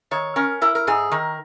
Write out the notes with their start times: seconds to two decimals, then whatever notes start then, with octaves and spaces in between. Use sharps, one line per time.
0.11 D#3 C#5
0.36 C#4 A#4
0.61 E4 A#4
0.75 A#4
0.87 G#2 G#4
1.12 D#3 A#4